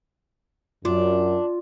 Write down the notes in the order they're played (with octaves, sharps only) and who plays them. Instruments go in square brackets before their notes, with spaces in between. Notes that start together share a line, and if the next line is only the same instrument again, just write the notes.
[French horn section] F#2 [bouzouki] D4 [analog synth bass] F4